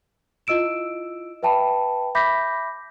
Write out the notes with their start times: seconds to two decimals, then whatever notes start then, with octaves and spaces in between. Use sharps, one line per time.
0.47 E4 F4 D#5 E6 D7 E7
1.43 B4 E5 G5 A5 B5
2.15 E5 B5 D6 G6 A#6 B6